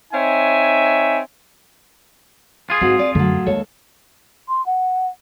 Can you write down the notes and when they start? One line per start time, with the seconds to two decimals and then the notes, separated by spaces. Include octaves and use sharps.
0.13 C4 D#4 C#5 E5 G#5
2.70 F4 G#4
2.81 G#2 C4 F#4
2.99 D5
3.15 F#2 D3 F#3 A3
3.46 D#2 G#3 A4 C#5
4.48 C6
4.66 F#5